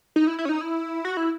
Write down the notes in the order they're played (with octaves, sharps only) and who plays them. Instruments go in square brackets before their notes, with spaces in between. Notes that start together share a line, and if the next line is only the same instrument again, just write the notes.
[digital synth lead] D#4
E4
E4
C#4
D#4
E4
F#4
E4